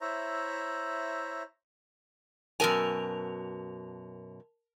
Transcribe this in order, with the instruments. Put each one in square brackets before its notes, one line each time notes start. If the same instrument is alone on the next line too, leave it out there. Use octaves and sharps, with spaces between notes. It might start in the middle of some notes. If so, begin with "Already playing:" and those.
[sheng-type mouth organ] E4 C5 C#5 E5 A#5
[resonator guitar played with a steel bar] F#2 B2 G#5 [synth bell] A#4 A5 F7